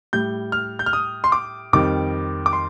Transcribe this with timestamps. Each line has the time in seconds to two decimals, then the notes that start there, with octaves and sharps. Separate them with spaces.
0.13 A2 G3 G6
0.52 F6
0.79 G6
0.86 F6
0.93 D#6
1.24 C6
1.32 D6
1.73 F2 D#3 G3 D6
2.46 D6
2.53 C6